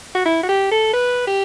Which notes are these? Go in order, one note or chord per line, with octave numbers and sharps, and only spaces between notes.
F#4
E4
F#4
G4
A4
B4
G4